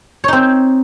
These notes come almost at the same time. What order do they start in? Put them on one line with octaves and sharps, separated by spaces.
C#5 D#4 C4